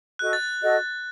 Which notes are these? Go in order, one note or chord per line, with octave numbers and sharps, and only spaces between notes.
F#4 A4 D#5 F#6
A6
F#4 A4 D#5